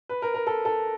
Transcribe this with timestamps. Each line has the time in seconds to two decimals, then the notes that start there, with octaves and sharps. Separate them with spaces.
0.09 B4
0.22 A#4
0.34 A#4
0.47 A4
0.65 A4